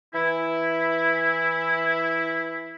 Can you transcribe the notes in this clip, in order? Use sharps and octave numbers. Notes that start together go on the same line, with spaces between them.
E3 E4